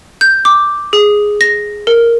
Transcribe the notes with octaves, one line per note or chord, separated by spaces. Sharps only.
G6
D6
G#4
A#6
A#4